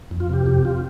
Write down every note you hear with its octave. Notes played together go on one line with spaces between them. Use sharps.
F2
F4
C3 G4
F2 G4
F4